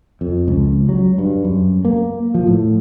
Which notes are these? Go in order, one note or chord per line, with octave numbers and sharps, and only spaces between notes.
F2
C#2
F#3
G2
F#2
A#3
F3
A2